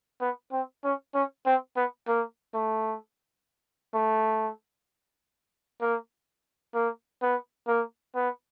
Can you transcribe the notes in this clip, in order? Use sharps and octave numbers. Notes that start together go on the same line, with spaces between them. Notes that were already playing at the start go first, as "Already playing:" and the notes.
B3
C4
C#4
C#4
C4
B3
A#3
A3
A3
A#3
A#3
B3
A#3
B3